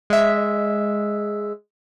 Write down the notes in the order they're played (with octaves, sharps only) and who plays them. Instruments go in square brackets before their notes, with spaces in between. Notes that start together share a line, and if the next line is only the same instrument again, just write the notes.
[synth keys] G#3 E5